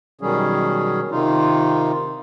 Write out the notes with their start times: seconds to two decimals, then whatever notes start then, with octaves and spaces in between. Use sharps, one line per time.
0.21 B2 D#3 F#3 G3 C#4 G#4
1.11 C3 D#3 D#4 F4